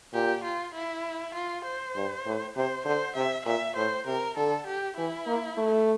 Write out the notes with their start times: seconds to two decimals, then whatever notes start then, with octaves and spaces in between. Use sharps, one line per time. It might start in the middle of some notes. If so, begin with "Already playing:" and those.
0.13 A#2 G4
0.44 F4
0.74 E4
1.35 F4
1.65 C5
1.96 G2
2.25 A2
2.55 C3 C5
2.85 D3 C5
3.16 C3 E5
3.45 A#2 E5
3.76 A2 C5
4.06 C3 A#4
4.37 D3 A4
4.67 G4
4.97 E3 E4
5.27 A#3
5.57 A3